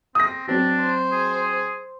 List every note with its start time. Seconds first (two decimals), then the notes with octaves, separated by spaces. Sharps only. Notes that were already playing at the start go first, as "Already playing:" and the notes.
0.15 C4 D#6 A#6
0.48 F#3 C4 D4 F#4
0.81 C5
1.12 G#4